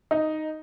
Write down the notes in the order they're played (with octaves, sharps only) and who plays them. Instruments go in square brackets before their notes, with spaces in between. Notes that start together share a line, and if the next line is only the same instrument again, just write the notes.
[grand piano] D#4